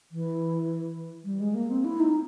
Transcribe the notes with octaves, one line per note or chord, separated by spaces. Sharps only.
E3
G3
G#3
A#3
C4
E4
D#4